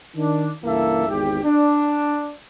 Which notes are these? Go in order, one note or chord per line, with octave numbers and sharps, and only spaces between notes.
D#3 D4
C#2 G2 E3 A#3 A4 E5
G#1 E2 G#2 G4
D4